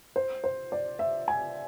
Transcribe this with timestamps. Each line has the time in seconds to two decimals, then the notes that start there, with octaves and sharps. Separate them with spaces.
0.16 C5
0.44 C5
0.72 D5
0.99 E5
1.28 G#5